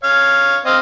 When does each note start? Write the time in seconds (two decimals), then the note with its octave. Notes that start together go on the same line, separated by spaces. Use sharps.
0.04 C#5 F5
0.66 C4 D#5 F5